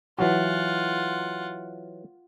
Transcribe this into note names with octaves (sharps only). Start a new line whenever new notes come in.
E3 F#3 F4 F#4 F#5